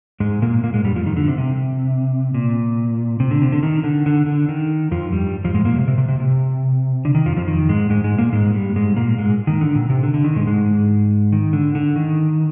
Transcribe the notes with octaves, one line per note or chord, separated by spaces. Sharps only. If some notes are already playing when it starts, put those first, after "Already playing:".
G#2 G#3
A#2 A#3
A#2 A#3
G#2 G#3
G2 G3
F2 F3
D#3
D3
C3
C3
A#2
C3
D3
C3
D3
D#3
D3
D3
D3
D#3
F2 F3
G2 G3
F2 F3
G#2 G#3
A#2 A#3
C3
C3
C3
C3
C3
D3
D#3
F2 F3
F2 F3
D#3
G#2 G#3
G#2 G#3
G#2 G#3
A#2 A#3
G#2 G#3
G2 G3
G#2 G#3
A#2 A#3
G#2 G#3
D#3
D3
A#2
C3
D3
D3
D#3
G#2 G#3
G#2 G#3
D#3
D3
D3
D#3